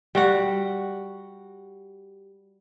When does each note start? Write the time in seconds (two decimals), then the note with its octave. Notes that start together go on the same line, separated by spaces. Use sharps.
0.15 G3 F#4 F#5